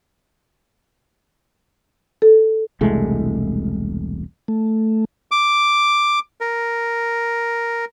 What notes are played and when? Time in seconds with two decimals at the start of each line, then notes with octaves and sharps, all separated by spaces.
2.22 A4
2.81 E1 C2 G#3 A3
4.48 A3
5.31 D6
6.41 A#4